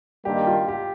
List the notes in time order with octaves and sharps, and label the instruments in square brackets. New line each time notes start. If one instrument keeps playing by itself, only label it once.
[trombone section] G2 D#3 G3 A#3 [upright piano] G4
[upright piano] F4
G4